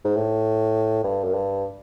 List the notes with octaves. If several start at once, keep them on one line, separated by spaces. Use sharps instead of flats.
G#2
A2
G2
F#2
G2